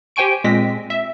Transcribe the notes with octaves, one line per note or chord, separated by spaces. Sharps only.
G4 C5 G5 G#5 C#6 D7
A#2 G#3 C4 A#6 B6
E5